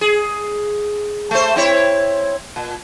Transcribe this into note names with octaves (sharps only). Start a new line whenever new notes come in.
G#4
A3 C5
C4 E4 C#5
A#2